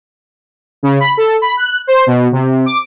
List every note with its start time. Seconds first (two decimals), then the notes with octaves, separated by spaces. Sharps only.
0.83 C#3
1.00 B5
1.17 A4
1.42 B5
1.57 F#6
1.87 C5
2.07 B2
2.32 C3
2.66 D6